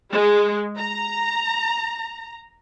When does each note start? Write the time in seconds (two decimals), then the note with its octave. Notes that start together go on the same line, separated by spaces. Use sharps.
0.12 G#3
0.77 A#5